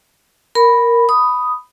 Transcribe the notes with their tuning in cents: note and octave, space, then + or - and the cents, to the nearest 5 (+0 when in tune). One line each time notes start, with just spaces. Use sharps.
A#4 +0 B5 +0
B5 +5 D#6 +0